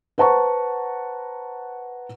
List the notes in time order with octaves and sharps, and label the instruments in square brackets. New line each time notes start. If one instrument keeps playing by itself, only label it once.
[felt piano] B4 C5 F#5 A5 A#5 C#6